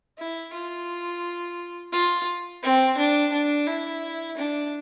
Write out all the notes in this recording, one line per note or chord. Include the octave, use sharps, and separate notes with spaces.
E4
F4
F4
C4
D4
D4
E4
D4